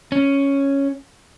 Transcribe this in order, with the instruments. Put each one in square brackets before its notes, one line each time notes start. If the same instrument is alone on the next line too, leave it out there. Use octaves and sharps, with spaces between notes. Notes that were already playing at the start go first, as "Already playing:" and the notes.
[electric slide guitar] C#4